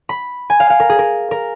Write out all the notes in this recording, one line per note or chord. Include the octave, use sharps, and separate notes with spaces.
B5
G#5
F5
F5
A#4
G#4
A#4
A#4